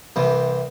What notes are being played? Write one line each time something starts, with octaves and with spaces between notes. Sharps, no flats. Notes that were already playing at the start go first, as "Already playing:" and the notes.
C2 C3 E3